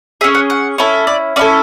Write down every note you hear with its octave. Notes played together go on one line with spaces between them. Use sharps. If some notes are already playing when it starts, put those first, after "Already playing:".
C#4 G#4 E5
F#5
F#5
C#4 E4 A4
D5
C#4 E4 A4 D5